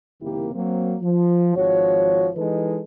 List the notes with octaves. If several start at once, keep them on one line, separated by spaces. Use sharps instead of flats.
F#1 C3 D#3 A#3 E4 G4
F#3 A#3 C4
F3
G#1 F3 F#4 C#5
E3 G#3 D#4 A4 B4